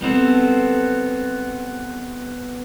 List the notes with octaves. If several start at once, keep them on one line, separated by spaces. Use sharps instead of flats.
G3 B3 C4 A4